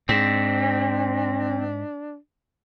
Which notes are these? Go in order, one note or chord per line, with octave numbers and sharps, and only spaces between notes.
G#2 C4 D4